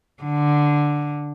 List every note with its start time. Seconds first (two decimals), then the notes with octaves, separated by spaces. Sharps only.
0.23 D3